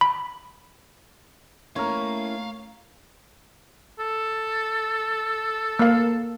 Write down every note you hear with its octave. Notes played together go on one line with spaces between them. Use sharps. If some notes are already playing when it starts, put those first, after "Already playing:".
B5
A3 A#3 C#4 E4 A#4 C#5 F5
A4
A#3 F5